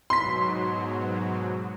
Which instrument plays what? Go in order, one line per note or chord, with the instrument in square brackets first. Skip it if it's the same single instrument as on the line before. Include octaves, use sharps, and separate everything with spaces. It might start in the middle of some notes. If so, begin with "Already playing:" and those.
[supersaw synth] G#2 B2 F#3 [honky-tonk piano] C6 B6